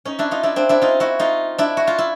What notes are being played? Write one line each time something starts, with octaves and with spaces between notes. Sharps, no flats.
C#4 D#4
D4 E4
D#4 F4
D4 E4
C4 D4
D4 E4
D#4 F4
E4 F#4
D#4 F4
D4 E4
F#4
F4
E4